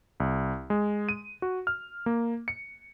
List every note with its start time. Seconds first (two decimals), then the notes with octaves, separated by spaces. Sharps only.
0.20 C2
0.70 G#3
1.09 D#7
1.42 F#4
1.67 F6
2.06 A#3
2.48 C#7